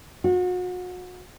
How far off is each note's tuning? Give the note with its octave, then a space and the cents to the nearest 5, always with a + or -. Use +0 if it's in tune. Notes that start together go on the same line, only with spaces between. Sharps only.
F#4 -35